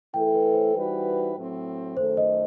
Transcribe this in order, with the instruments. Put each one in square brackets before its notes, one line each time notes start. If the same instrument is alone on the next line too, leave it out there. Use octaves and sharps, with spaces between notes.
[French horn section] E3 A3 E4 A4 [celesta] G5
[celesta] B4
C5
[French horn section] E3 G3 D#4 F#4 B4
A2 F#3 C4
[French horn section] F#2 D#3 A3 [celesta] C5
[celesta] D#5